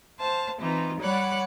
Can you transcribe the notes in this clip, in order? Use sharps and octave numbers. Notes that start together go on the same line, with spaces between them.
C5 F5 A5
E3 C4 D#4 F4
G3 C#5 D5 F#5 B5 F#6